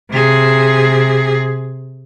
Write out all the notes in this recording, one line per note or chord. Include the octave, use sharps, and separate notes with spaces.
C3 G#4